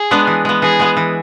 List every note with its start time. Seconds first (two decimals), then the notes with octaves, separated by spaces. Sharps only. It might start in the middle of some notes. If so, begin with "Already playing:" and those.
Already playing: G#4
0.11 G#3 B3 D4
0.27 E3
0.45 G#3 B3
0.62 E3 G#4
0.80 G#3 B3
0.97 E3